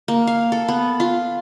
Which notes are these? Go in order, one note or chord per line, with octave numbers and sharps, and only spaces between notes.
A#3
F5
A4
B3
F4